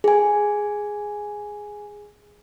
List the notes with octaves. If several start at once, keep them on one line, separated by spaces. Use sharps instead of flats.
G#4 G#5